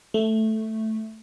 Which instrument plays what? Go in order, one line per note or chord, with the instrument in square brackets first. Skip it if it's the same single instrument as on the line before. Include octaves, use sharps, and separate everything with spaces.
[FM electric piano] A3